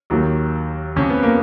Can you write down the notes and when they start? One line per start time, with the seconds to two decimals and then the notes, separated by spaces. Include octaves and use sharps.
0.10 D#2 D#3 F#3
0.96 F2 F3 C#4
1.10 B3
1.23 A#3